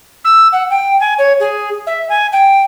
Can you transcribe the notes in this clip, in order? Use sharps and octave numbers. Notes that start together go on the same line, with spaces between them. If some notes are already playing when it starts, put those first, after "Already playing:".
E6
F#5
G5
G#5
C#5
G#4
E5
G#5
G5